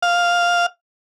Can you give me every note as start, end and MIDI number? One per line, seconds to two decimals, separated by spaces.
0.03 0.66 77